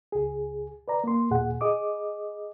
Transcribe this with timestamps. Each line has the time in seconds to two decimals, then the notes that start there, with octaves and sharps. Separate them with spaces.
0.12 C#2 G#4
0.88 B4 D5 A#5
1.04 A#3 C6
1.30 D#2 A#2 G#4 F#5
1.61 G#4 D#5 D6 D#6